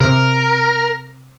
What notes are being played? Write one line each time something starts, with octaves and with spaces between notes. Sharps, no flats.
C3 A#4